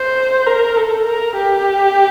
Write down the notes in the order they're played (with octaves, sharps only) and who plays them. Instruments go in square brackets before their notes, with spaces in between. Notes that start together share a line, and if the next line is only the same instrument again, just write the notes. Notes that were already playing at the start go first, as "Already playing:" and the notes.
Already playing: [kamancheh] C5
A#4
A4
A#4
G4